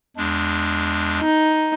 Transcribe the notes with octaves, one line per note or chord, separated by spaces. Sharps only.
E2 G#3 D4
D#4